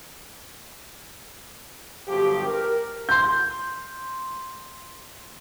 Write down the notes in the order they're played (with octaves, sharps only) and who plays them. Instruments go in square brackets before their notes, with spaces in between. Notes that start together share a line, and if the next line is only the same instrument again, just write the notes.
[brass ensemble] G1 F3 F#3 G4
A#4
[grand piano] C6 G6